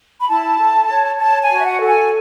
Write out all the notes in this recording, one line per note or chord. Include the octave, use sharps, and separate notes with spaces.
B5
E4 A5
A4
C#5
C#5 A5
G#5
F#4
E5
F#5
A4
G#5